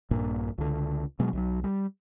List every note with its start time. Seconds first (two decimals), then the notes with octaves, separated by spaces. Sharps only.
0.11 A#1 G2 A#2
0.58 C#2 D3
1.20 B2 F#3 G#3
1.33 B1 D#3 F#3
1.64 G3